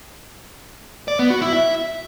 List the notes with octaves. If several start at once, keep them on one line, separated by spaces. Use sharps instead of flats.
D5
B3
F#4
E4
E5